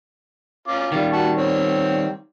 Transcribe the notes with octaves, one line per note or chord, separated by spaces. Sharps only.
C#4 F4 D6
D#3 G3 F4
F#4 A5 C#6
C4 C#5